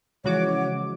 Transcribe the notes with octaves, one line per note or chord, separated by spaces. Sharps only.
C#3 E3 F3 G#3 F#4 C#5 D6